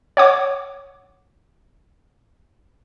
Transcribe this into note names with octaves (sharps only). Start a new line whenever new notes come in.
C#5 F#5 D6